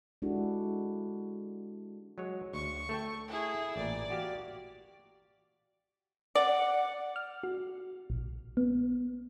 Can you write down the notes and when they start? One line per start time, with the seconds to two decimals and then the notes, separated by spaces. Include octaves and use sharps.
0.22 G#3 D4 E4 F#4 G4 A4
2.18 F#3 G#3 C#5
2.54 D2 C#6
2.89 A3 A4 G5
3.27 E4 G#4
3.76 A1 A#2 D5
4.10 F#4 G4 F5
6.35 D5 F#5
7.16 F6
7.43 F#4
8.10 A#1
8.57 B3